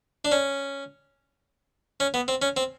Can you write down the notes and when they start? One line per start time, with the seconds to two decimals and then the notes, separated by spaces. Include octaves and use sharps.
0.25 D4
0.32 C#4
2.00 C#4
2.14 B3
2.28 C4
2.42 C#4
2.57 C4